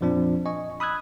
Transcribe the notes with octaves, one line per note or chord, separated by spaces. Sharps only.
F2 A#2 F3 C4 D4
D#5 G#5 C#6
B5 D#6 E6 F#6 G#6